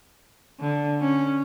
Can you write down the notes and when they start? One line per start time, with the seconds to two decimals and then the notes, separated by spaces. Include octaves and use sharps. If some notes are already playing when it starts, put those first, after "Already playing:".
0.60 D3
1.01 C#4